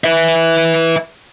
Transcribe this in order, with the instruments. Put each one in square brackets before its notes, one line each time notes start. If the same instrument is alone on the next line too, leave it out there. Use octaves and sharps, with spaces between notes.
[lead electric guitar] B4 E5